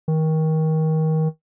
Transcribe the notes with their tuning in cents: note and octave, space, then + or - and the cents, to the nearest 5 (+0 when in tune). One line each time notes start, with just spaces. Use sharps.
D#3 +25